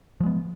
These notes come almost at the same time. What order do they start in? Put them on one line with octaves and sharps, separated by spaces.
F3 G#3 B3